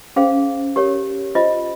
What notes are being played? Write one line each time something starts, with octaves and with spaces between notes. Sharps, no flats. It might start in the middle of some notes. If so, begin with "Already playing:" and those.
C#4 G#4 C5 F5
G4 A#4 C#5
F4 C5 D#5